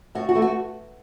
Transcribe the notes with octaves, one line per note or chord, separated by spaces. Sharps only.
A2 F#4
F#4
E3 A3
F#4